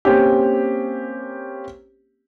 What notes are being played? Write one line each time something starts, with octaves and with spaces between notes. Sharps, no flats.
A#3 C4 C#4 G4